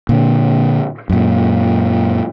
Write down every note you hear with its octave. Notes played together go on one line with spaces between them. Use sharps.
A#2 D3
F#2 A#2